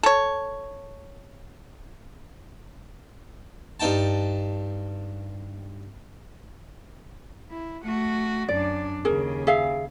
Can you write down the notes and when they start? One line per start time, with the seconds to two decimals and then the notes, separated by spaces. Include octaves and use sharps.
0.03 A4 C#5
3.80 G2 D#4 G5 A5
7.51 E4
7.85 A3 F#4
8.48 F#2 D4 D5
9.05 D#2 C#3 G#4 A#4
9.47 G#4 E5 F5